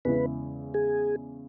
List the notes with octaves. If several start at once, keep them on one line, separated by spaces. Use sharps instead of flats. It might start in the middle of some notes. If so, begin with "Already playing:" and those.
E2 C#3 G#3 E4 B4
G#4